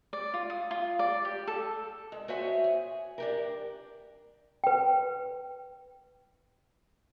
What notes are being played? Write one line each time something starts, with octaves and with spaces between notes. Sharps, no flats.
D5
F4
D#6
F4
D5
G4
A4
G#3
F#4 C5 C#5 E5 G#5
G#4
D4 G4 A#4
B4 G5